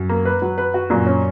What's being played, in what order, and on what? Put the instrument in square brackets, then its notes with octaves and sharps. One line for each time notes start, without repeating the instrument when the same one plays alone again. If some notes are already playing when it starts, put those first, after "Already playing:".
Already playing: [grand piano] F#2
[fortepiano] A#3
B4
F#3
B4
F#4
[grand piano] F#2 [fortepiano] A#2
[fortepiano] C#4